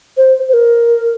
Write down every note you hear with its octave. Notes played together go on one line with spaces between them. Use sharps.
C5
C5
A#4